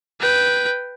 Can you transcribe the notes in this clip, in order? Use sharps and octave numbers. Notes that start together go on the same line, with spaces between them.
B4 G5